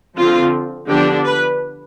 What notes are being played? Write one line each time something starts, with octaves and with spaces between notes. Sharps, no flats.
D3 F3 C4 F4
D3 F3 B3 D4 G4
B4